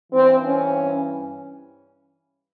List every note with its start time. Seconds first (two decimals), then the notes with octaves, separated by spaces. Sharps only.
0.13 G2 E3 C4
0.45 C#4